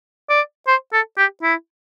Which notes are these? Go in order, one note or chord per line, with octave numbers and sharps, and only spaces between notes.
D5
C5
A4
G4
E4